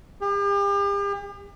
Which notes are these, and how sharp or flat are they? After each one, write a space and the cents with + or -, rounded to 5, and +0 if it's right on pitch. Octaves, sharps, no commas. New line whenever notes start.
G4 +40